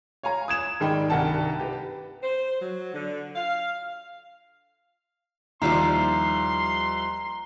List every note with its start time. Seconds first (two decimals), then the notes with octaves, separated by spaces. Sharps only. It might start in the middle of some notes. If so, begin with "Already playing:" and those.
0.23 C#5 F5 G#5 A#5
0.48 D#6 G#6 E7
0.80 G#2 D#3 G#4 D5 G5 B5
1.10 C2 G2 D#3 F#5 G5 A5
1.59 G4 B4
2.23 C5
2.61 F#3
2.94 D3
3.35 F5
5.62 D#2 F3 G3 E4 A#5 C6 C7